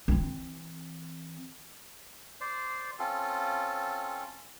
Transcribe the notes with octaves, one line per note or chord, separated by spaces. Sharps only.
E3 C4
C5 D5
C4 C#4 F4 A4